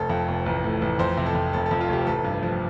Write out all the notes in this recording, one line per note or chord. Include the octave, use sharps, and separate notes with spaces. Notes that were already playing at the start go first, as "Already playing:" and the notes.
Already playing: F1 A4
F2
F1
A1
A2
A1
F2 C5
C3
A4
F2
F1 A4
A4
F2
F4
F1 G4
A1 A4
G2
F3